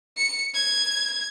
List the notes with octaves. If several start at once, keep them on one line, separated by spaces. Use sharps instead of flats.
C#7
G#6